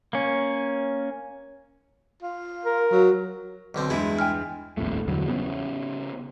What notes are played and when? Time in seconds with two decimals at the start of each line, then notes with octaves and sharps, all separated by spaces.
0.13 A#3 C#4
2.22 F4
2.65 A#4
2.91 F#3
3.74 B1 D3 C4
3.90 E2 G2 G#3 E4
4.19 G5 G#5 F6
4.77 D#1 A#1 F2 A3
5.07 E2 G2 D3 F#3
5.28 C#3 B3 C#4